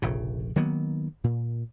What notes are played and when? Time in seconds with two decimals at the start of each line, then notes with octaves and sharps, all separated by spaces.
0.02 F1 A#1 C#3
0.56 D#3 F#3 A#3 B3
1.24 A#2